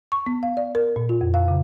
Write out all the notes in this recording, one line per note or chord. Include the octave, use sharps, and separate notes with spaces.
C#6
B3
F5
D5
A#4
A#2
F4
F2
F5
C#3